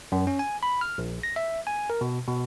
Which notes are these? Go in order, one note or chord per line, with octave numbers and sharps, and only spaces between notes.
F#2
C#4
G#5
B5
F6
A#1
A#6
E5
G#5
A#4
B2
B2